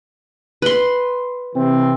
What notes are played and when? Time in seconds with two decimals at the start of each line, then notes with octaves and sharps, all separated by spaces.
0.62 B4 C6
1.55 C3 E3 C4